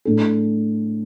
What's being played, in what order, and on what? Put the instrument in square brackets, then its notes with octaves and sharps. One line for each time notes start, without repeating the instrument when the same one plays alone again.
[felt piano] A2 A3 D4 A4